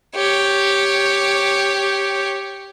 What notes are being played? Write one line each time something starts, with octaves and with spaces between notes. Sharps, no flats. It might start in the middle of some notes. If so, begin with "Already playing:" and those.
G4 C#5